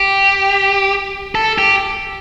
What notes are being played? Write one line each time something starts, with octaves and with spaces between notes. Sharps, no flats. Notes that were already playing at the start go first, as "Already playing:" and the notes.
Already playing: G4
A4
G4